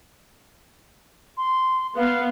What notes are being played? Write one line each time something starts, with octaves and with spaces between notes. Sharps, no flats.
C6
B3 F5